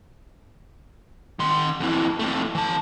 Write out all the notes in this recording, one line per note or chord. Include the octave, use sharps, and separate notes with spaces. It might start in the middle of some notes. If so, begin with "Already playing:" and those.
D#3 C6
F2 E3
F2 A3
E3 A5